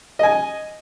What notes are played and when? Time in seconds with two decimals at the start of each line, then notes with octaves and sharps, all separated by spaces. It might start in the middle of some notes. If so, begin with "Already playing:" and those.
0.19 D#5 G#5